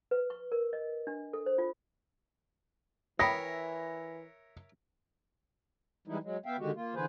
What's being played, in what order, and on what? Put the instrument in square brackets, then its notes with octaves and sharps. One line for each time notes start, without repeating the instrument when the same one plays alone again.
[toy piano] B4
C#6
A#4
D#5
D4
A4
C5
F4
[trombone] E3 [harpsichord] A#4 C#5 E5 [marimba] G5 B5 D#6 [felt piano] A#6
[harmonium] E3 G3 G#3 D#4 E4
F#3 G#3
B3 E5 F5 G5
D3 D#3 G#3 F#4 G4
A#3 F4
D3 E3 G#4 B4 C5